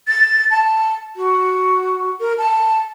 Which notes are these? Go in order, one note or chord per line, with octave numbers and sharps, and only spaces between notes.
A6
A5
F#4
A#4
A5